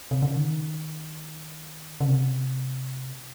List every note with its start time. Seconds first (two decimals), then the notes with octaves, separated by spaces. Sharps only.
0.11 C3
0.22 C#3
0.36 D#3
2.01 C#3
2.08 C3